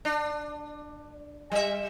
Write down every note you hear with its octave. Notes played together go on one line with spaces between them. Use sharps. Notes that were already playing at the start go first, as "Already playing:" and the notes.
D4
G3 E5